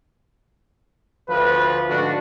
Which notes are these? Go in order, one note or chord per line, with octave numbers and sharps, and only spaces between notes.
D2 F3 B4
G#2 D3 D4 F#4